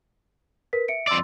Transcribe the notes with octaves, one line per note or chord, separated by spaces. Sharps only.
A#4 B4 B6
E5 C#7 D7
F2 D5 C6 E6 A6